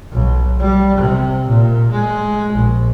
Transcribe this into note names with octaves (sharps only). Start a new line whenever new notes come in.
B1
G3
C3
A#2
G#3
A#1